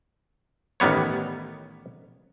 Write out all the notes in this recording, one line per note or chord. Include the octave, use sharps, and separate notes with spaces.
A1 D#3 G3 B3 C#5